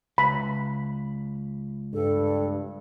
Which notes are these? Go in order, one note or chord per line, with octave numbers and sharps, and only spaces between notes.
C#2 B5
G2 A4